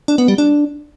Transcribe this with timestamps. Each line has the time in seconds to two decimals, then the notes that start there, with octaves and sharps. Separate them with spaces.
0.08 D4
0.18 B3
0.28 G3
0.38 D4